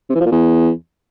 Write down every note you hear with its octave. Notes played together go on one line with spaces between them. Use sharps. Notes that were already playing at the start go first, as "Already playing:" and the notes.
C3
E3
F3
A#2
E2